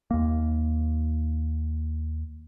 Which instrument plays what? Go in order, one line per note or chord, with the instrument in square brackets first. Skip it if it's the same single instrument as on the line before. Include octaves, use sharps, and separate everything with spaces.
[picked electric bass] D#2 A#3